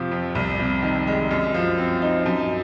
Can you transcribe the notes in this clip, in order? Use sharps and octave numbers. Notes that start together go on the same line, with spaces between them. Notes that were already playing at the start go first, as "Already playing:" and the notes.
Already playing: F2 C3 F3
F2
C2
C3
D#3
G#3
F#2
F3
C4
D#4
F#2